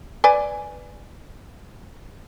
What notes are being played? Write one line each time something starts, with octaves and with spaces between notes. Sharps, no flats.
B4 D5 G#5